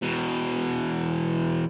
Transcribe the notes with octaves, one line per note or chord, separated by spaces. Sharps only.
E2 B2